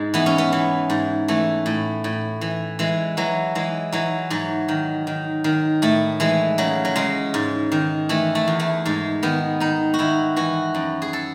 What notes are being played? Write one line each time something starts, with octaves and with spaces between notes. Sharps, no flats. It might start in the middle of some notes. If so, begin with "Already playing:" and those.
Already playing: G#2 G#3
E3 B3
C#4
B3
E3
G#2
E3 A3
A2
A2
E3
E3 G#3
E3 F#3
E3 G#3
E3 F#3
G#2 F#3
D#3
D#3
D#3
A2 A3
E3 G#3
C#3 F#3
F#3
C#3 G#3
G#2
D#3
E3 A3
A3
E2
A3
G#2 G#3
D#3 B3
D#3 D#4
F#4
D#3 E4
E3 F#4
F#2
G#4
A4